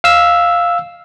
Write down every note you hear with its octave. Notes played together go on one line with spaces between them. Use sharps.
F5 E6